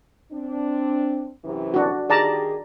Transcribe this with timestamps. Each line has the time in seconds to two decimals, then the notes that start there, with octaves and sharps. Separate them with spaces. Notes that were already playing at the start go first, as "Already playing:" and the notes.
0.32 C4 D4
1.44 F#2 C3 E3
1.74 D4 F#4
2.10 D#3 G4 G#4 D5 A5 A#5